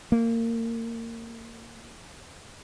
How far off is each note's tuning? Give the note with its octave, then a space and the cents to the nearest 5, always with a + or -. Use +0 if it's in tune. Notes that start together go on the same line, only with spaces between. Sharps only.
A#3 -25